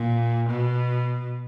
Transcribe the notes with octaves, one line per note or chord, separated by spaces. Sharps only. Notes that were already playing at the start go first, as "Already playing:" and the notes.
Already playing: A#2
B2